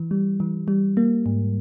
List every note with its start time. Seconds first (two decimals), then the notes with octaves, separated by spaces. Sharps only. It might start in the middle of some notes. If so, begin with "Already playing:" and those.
Already playing: E3
0.11 G3
0.40 E3
0.68 G3
0.97 A#3
1.26 G#2